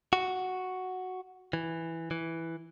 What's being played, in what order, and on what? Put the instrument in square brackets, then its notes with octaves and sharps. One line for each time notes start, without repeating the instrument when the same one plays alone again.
[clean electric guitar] F#4
E3
E3